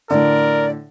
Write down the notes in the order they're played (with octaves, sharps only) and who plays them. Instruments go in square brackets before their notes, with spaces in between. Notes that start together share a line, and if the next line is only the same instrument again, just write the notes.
[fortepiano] A2 D3 [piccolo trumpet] A#4 [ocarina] D5